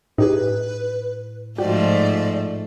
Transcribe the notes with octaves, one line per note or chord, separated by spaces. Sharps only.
A2 D#4 G4 G#4 B4
G#2 F3 A3 F#4 G4 D5 G5